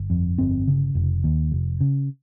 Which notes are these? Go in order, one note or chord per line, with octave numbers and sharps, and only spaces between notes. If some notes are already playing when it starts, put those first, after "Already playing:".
Already playing: G1
F2
G1 C4
C#3
F1
D#2
F1
C#3